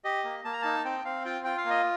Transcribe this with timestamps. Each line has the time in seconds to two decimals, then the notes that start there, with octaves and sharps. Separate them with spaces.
0.04 G4 D#5
0.24 A#3
0.44 A#3 A5
0.53 A#5
0.62 D#4 A5
0.85 C4 G5
1.05 C4 F5
1.25 F4 G5
1.44 F4 G5
1.57 F5
1.65 A#3 D#5